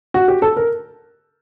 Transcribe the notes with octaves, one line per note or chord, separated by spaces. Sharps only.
F#4
G4
A4
A#4